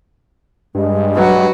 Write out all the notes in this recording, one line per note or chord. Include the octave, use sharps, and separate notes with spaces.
G2 G#3
F#3 F#4 B4